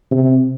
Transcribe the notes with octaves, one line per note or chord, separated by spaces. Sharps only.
C3